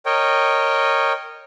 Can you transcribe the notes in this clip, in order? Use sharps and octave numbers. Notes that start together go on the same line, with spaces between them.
A#4 C#5 D#5 G5